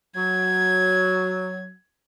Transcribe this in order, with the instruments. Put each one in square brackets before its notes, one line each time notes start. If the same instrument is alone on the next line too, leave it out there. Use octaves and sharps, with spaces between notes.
[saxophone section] F#3 [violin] G#6